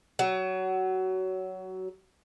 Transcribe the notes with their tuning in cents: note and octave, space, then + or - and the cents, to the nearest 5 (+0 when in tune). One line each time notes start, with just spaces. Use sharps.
F#3 +20